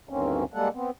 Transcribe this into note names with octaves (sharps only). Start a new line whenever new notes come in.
D2 G2 D#3 A#3 C4 C#4
G3 G#3 A#3 A4 F#5
B3 C4